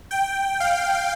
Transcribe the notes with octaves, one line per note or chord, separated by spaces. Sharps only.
G5
F5